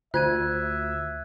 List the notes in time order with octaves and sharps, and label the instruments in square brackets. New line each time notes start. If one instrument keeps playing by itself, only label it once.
[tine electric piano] D2 [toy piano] F4 F#4 C5 [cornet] E5 [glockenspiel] F#6 G#6 D#7